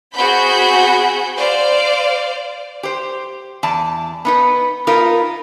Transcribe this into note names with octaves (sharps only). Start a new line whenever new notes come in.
C4 F#4 G#4 F#5 B5 G6
C5 D5 F5
G4 C5
E2 D5 A5
B3 D#4 B4
B3 D#4 F4 A#4